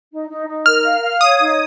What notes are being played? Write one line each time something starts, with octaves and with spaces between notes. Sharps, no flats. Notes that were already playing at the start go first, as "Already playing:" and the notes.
D#4
D#4
D#4
A#4 F6
F5
F5
C#5 D#6
D#4